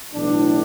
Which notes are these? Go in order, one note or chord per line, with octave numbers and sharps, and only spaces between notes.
B1 A2 E3 D4